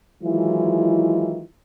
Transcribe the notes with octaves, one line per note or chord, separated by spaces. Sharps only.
D#3 E3 F#3 G#3 E4 F4